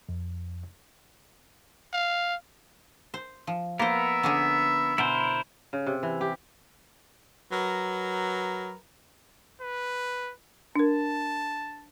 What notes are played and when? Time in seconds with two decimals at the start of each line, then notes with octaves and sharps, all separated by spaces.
0.09 F2
1.93 F5
3.14 C5
3.47 F3
3.79 A#3 B3 A#4 C5 E5
4.23 D3 C#4 G#4
4.98 B2 E4 A#4 C5
5.73 C#3
5.86 C3
6.03 E3
6.21 G4
7.52 F#3 A#4 B4
9.62 B4
10.76 D4 A#4 A5